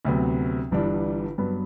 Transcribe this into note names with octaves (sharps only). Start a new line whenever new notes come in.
D2 C3 F#3 B3
G1 G2 E3 G3 D4
G2 F#3 B3